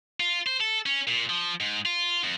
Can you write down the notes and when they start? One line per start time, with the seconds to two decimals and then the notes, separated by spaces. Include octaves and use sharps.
0.20 F4
0.46 C5
0.61 A4
0.86 C#4
1.07 A#2
1.30 F3
1.60 G#2
1.85 F4
2.23 F2